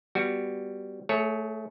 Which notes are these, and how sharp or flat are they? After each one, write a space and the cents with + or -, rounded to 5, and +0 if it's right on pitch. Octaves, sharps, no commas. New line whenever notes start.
G3 +0 B3 +0 F#4 +0
A3 +0 G#4 +35 C#5 +0